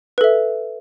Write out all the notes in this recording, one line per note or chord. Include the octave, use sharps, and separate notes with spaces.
A4 B4 E5